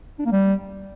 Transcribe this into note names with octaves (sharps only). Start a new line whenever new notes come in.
D4
A#3
G3